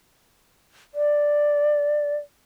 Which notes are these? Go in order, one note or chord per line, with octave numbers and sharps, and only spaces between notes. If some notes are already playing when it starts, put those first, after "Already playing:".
D5